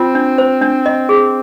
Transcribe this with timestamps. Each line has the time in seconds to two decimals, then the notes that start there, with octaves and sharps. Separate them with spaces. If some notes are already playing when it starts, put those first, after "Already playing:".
Already playing: C4 F4
0.15 D4
0.38 C5
0.62 D4
0.86 D#5
1.09 G#4